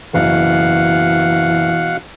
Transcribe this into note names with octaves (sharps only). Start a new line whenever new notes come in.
F#1 B2 E3 F5 F#5